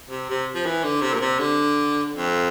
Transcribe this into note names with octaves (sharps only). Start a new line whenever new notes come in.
C3
C3
F3
E3
D3
C3
A#2
C3
D3
F2